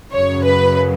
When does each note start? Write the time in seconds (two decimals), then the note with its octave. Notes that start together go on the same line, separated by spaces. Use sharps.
0.11 F#2 C#3 F#3 C#5
0.44 B4